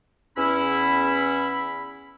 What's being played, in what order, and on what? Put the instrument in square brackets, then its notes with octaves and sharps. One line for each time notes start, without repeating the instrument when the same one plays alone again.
[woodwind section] E2 C#4 E4 B5